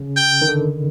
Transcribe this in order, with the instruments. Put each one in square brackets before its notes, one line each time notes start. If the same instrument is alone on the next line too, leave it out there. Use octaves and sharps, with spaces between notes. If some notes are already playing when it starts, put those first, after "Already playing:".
Already playing: [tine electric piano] C#3
[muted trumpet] G5
[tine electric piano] D#3
D3